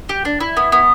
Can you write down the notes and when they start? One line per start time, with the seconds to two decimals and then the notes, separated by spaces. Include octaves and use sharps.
0.09 G4
0.25 D4
0.40 E4
0.57 B3
0.72 B3